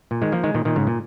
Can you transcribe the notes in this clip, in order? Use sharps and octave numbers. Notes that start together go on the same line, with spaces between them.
A#2
D#3 G#3
F3 A#3
D#3 G#3
A#2 D#3
A#2 D#3
G#2 C#3
A#2